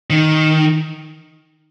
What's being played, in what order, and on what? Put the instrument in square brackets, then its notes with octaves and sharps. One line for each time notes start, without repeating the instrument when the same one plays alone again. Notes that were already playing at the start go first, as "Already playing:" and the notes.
[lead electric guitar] D#3